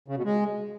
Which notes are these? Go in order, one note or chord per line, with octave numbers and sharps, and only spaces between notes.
C#3
B2
G#3